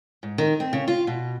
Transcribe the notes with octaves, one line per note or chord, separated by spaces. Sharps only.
G#2
D#3
C4
C#3
F4
B2